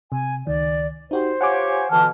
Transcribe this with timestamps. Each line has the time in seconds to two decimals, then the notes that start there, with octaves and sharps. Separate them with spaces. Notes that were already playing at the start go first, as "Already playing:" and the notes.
0.12 C3 G#5
0.47 C#2 D#3 D5
1.11 D#4 F#4 G4 C5
1.41 F4 G4 C#5 F#5 G#5 D6
1.91 B2 D3 E3 A5 F6